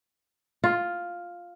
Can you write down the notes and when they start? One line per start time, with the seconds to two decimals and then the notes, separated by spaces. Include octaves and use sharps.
0.64 F4